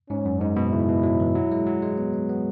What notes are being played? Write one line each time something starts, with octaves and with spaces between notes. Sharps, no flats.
G#2 C#4
F#2
G#2 D#4
B2
C#3 E4
B2
F#3
E3
F#3
G#3
F#3
G#3
B3
B3
B3